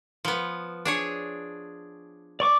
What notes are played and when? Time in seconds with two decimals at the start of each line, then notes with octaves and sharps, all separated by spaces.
0.25 F3 B3
0.85 D4 G#4 C#5
2.40 D5 C#6 D6